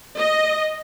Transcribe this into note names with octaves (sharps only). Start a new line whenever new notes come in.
D#5